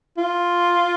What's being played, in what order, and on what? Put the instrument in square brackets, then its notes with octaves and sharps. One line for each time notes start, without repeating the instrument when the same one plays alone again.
[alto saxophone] F4